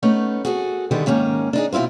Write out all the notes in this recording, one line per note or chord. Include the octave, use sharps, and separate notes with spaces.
A3 B3 C#4 D#4
F#4 G#4 A4
D3 D#3 G3 G#3 B3
G#2 D#3 A#3 C#4
D4 D#4 G#4
B2 C4 E4 F4 C5